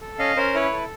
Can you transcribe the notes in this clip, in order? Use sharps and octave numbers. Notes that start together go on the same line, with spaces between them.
A4
C#4 D#5 F5
C#4 A#4 C5
E4 B4 C#5
A4